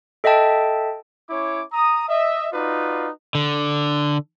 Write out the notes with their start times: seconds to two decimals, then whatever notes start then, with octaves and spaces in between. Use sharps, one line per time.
0.24 A4 D#5 E5 G5 A5
1.30 C#4 E4 C#5 D6
1.73 A#5 D#6
2.09 D#5 E5
2.53 D#4 F4 F#4 B4 D5
3.35 D3